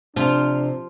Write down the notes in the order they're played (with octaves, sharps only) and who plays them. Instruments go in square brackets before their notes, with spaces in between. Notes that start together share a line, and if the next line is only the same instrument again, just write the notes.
[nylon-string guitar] C3 [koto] F3 F4 [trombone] D4